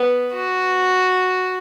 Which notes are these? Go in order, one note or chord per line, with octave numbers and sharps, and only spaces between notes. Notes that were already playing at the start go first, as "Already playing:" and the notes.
Already playing: B3
F#4